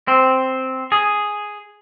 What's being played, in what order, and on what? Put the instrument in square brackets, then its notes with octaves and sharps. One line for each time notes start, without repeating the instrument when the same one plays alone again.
[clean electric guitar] C4
G#4